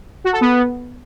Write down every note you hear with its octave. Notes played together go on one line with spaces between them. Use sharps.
F#4
A4
B3